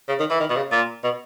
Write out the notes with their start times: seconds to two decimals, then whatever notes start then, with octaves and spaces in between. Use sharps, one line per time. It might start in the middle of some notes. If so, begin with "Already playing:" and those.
0.09 C#3
0.20 D#3
0.30 E3
0.40 D#3
0.50 B2
0.56 C#3
0.72 A#2
1.04 B2